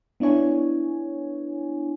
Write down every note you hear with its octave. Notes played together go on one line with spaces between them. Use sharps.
B3 D4 E4 C#5 G#5